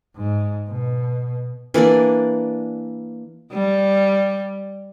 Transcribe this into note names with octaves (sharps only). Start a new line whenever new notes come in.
G#2
B2
E3 A#3 D4 D5
G3